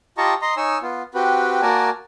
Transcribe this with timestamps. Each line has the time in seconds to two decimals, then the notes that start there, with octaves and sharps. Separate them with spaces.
0.18 F4 G4 D#5 A5 A#5 C#6
0.42 D#5 A#5 C6
0.57 D#4 C#5 G#5 E6
0.82 B3 F4
1.14 C4 F#4 G4 B4
1.62 A#3 F#4 A#4 D5 G#5 A5